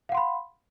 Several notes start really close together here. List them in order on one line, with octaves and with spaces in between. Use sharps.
F5 F#5 C6 B5